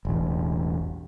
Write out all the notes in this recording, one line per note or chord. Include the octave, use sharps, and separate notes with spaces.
E1 A1